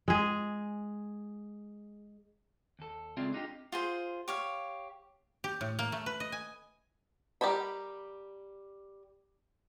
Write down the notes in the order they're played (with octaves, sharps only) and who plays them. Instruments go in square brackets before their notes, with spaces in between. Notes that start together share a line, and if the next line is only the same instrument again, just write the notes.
[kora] G#3 G#4
[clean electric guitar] D#2 A4
C#2 C4 F4 G#4 D5 E5
D4 D#4 F4 G4
[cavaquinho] F4 G#4 C5
G4 C#5 F5
[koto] G4
A2
A#3
A3
B4
D#5
G#5
[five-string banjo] G3 G4 A#4 C5 B5